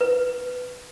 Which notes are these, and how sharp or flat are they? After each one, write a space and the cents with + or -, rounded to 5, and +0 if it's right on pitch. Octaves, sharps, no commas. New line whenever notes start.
B4 +10